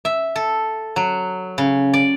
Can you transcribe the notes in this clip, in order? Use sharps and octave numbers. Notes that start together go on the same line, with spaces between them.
E5
A4
F#3
C#3
D5